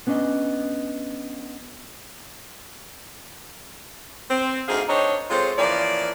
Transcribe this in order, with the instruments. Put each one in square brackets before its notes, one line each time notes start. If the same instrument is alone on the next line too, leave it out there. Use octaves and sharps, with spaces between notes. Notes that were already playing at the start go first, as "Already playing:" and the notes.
[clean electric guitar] B3 C#4 D4 D5 D#5
[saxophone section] C4
D2 D#4 G#4 C5 F5
D#3 D4 D#4 C5 C#5 D#5
G#3 C4 F4 A4 C5 C#5
E3 F3 A#3 C#4 D5